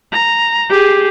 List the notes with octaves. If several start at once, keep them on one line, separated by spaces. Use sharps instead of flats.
A#5
G4 G#4